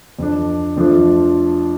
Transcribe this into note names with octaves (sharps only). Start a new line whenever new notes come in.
F2 F3 D4
F2 F3 A3 D4 F4